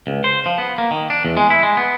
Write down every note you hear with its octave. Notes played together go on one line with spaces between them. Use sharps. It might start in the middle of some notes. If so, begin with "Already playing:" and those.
C#2
C5
F3
B3
A#3
D#3
D4
E2
G#3
E4
G#3
B3